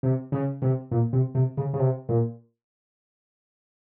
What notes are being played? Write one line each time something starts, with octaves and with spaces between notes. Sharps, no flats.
C3
C#3
C3
A#2
C3
C3
C#3
C#3
C3
A#2